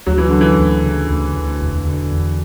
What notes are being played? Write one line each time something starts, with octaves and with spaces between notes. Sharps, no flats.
D2 F#3
E3
D3 F#3
E3
D2
C#3
D2
D2
E1
D3
E2